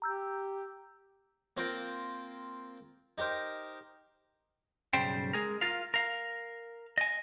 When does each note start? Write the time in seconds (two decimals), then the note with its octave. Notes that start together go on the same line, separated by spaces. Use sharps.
0.02 G4 A#5 E6 G6
1.57 A#3 C4 F4 A#4 G5
3.18 D#4 G4 A#4 C5
4.93 B1 G2 C#3 G3 C5 G5
5.33 G#3 G#4 A#4
5.61 F4 A#4 F5
5.94 A#4 F5
6.98 D#5 G#5